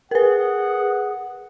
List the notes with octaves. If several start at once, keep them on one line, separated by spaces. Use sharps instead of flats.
G#4 A#4 B4 F#5